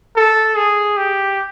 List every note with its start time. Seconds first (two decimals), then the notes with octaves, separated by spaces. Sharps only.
0.16 A4
0.56 G#4
0.97 G4